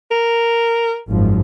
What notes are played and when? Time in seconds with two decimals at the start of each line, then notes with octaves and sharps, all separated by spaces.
0.11 A#4
1.07 G#1 F#2 F3